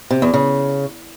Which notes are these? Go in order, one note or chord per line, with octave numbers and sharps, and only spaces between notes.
C3
E2
C#3